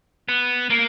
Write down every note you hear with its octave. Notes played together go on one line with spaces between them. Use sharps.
B3
A#3